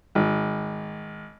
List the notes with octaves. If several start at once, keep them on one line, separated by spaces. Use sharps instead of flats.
G#1